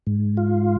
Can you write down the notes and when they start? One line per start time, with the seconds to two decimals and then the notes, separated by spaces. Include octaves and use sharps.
0.07 G#2
0.37 F4